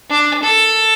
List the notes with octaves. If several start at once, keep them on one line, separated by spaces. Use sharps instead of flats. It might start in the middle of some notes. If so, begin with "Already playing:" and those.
D4
A4